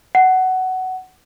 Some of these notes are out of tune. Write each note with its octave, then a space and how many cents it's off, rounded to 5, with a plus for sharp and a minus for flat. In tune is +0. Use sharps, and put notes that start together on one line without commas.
F#5 +15